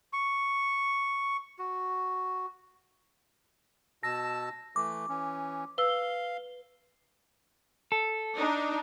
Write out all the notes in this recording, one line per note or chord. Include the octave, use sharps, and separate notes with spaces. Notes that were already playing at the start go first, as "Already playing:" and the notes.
C#6
F#4
B2 A5 E6 A#6
E3 A3 D6
E3 C#4
B4 F5 E6 G7
A4
D4 D#4